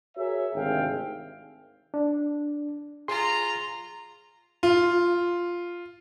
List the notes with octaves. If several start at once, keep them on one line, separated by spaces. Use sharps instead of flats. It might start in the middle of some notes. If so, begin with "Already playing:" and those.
F#4 G#4 A#4 C#5 E5
G#1 D2 C3 G#4 F5 G5
D4
F4 G#4 A#5 C6
F4